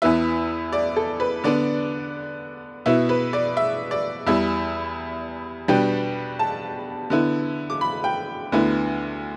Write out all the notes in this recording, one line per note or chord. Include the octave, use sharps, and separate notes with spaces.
E2 E3 B3 E5
D5
A4
B4
D3 B3 D4 D5
B2 B3 E4 E5
B4
D5
E5
D5
E2 E3 G3 E4 E5
B2 G3 B3 D4 G5
A5
D3 B3 E4
D6
B5
G5
D2 D3 B3 E4